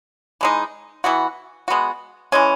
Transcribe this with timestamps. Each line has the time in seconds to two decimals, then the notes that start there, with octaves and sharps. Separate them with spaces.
0.41 E3 G#3 D#4
1.04 E3 B3 F#4
1.68 G#3 B3 F#4
2.32 E3 G#3 C#4